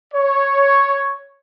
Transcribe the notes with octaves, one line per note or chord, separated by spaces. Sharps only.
C#5